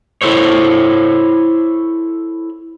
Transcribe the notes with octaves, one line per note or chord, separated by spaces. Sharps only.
E4 A4 C5 C#5